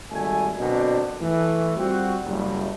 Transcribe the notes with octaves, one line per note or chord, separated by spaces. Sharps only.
G#1 G3 A3 G#5
B2 D3 F#3 A#3 C4 D4
E3 A3
G3 C4 F4 F#4
F#1 G3